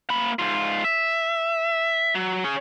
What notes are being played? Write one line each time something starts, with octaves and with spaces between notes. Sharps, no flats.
A#3 B5
G#2 F4
E5
F#3
C#4 G#4